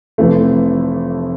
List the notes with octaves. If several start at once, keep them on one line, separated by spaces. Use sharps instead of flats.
F1 F2 E3 A3